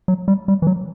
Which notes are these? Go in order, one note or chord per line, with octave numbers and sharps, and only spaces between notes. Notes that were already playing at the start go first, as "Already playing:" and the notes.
F#3
G3
G3
E3
F#3